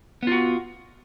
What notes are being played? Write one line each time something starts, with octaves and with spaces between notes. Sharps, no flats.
B3 F4 F#4